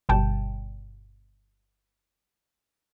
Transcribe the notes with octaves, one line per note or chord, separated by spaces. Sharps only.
G1 B2 G3 G5 A5